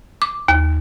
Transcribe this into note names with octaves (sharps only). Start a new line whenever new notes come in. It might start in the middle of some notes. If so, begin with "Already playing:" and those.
D6
D#2